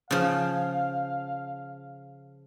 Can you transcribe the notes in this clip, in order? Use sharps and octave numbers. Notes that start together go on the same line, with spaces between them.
C#3 F3 F5